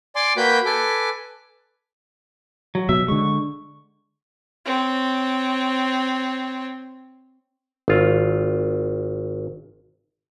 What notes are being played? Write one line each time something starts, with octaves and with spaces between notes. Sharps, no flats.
D5 G#5 C6 D6
A#3 F#4 B4 G5 B5 G6
A4 B4 G#5 D6
F#3
B2 F#3 E5
D3 G#3 C#6
C4 C#5
G#1 F4